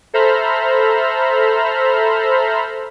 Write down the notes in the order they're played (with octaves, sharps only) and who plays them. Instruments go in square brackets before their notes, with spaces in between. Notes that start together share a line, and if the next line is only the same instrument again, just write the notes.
[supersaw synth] A4 C5 E5 A#5 B5 F6